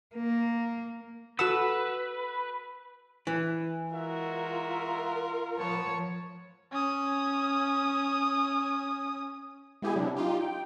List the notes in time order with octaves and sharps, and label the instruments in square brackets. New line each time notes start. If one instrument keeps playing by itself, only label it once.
[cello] A#3
[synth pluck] F#4 A4 F#5 [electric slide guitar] B4 [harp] E6 E7
[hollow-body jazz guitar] E3
[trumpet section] G#3 F#4 E5 [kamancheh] F4 A#4
[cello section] F3 C#5 [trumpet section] B3 C5 A5
[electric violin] C#4 D#6
[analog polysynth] G#3 B3 E4 G4 G#4 G#5
C3 F#3 D4 E4
D#4 F4 G4
G5